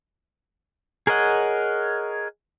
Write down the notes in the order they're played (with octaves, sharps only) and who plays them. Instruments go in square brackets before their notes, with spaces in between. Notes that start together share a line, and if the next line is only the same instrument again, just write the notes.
[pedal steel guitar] G#4 A#4 C#5 D#5 F#5